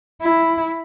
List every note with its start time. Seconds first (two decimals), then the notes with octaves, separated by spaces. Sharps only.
0.22 E4